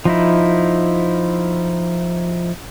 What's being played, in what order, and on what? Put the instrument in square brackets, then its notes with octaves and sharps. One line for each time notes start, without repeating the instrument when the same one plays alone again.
[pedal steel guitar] F3 D#4 E4